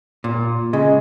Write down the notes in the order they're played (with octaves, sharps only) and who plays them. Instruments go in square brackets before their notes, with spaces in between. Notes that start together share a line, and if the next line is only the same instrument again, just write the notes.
[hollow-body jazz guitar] A#2
[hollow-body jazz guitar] C#3 [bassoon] G#3